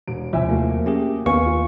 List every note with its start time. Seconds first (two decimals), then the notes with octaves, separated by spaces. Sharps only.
0.08 E1 D7
0.33 D#2 C3 F3 E4 E5 G#5
0.48 A3 A#3 F#4
0.86 C#4 G4 G#4
1.26 D#2 B3 F5 G#5 C#6
1.46 F4